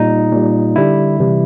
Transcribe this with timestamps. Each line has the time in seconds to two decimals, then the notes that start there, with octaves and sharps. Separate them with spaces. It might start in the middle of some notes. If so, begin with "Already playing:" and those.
Already playing: A#2 G3 D#4
0.32 A#2 G3
0.76 D3 G3 E4
1.20 C3 E3 G3